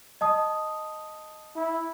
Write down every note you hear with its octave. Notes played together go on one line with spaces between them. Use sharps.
D#5 A5 D#6
E4